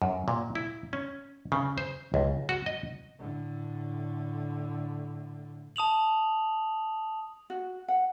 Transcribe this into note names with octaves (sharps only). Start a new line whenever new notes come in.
F#2
A#2
E4
C#4
C#3
C5
C#2
F#4
D#5
A2 D3
A5 D#6 F7 F#7
F#4
F#5